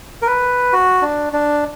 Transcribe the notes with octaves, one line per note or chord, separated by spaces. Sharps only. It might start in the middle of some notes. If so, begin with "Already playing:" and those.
A#4
B4
F#4
D4
D4